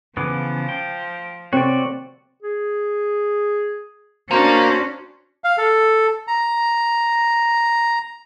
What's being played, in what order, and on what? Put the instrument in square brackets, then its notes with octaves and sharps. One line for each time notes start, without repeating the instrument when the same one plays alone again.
[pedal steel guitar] C#3 E3 B3 [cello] F3 [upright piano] D6
[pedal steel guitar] G5
[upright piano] C3 [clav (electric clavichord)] C4 C#5 [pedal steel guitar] F#4 D5
[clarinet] G#4
[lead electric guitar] A#3 [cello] C#4 D4 [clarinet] F#4 [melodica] C5
[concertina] F5
A4
A#5